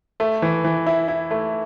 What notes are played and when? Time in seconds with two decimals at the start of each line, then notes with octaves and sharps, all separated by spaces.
0.20 A3
0.42 E3
0.64 E3
0.87 E4
1.08 E4
1.31 A3